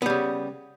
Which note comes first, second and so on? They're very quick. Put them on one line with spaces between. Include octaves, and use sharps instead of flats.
B3 G3 C#3